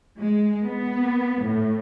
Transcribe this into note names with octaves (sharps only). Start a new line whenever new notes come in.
G#3
B3
A2